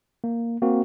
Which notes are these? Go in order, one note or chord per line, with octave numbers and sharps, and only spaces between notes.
A#3
A#3 C4 F#4